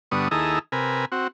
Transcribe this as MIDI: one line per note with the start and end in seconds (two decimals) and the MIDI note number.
0.12 0.28 43
0.12 0.28 50
0.12 0.28 59
0.12 0.28 85
0.12 0.28 87
0.31 0.59 39
0.31 0.59 64
0.31 0.59 68
0.31 0.59 69
0.31 0.59 75
0.31 0.59 82
0.72 1.05 48
0.72 1.05 70
0.72 1.05 71
0.72 1.05 80
1.12 1.28 60
1.12 1.28 66